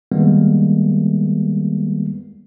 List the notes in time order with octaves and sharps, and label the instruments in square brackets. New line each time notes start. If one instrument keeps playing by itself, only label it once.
[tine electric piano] D#3 G3 G#3 A#3 B3